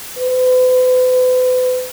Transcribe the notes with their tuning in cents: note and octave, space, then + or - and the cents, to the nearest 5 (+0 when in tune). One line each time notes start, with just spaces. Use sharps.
B4 +45